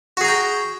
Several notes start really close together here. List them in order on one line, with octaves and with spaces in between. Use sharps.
F#4 G#4 A#5 G5